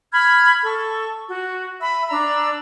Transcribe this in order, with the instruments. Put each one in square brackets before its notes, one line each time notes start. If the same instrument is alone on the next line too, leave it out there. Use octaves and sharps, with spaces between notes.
[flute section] B5 F6 G#6
A4 C#6
F#4
E5 B5 E6
D4 D5 A#5 E6